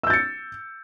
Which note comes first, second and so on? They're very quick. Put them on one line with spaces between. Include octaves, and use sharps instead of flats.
E6 G6 A6 C#7